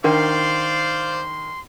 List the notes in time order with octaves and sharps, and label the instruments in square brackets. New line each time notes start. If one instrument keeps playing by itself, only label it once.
[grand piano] D#3 [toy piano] D4 A#4 F#5 [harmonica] C5 D5 F5 [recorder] C6